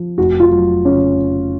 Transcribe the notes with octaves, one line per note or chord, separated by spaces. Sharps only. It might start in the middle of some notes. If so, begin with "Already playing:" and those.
Already playing: F3
F1 F#4
F4
F#3
C#3 C#4